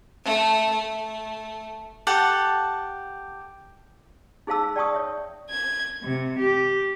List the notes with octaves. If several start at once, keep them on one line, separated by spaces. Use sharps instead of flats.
A3
A3
G4 A4 F#5 A5
D#4 G#4 C5 F5 A5 E6
D5 G5 A5 C#6 D#6
C#5 E5
G#6
C3
G4